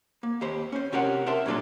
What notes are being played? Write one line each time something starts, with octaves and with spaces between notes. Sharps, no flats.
A#3
D#2 G4 C5 B5
C#4 C5
C3 C#4 G4 A#4 C5 F#5
A#4 C5 E5 A5 C6
A#2 F#3 G3 D4 F4 A4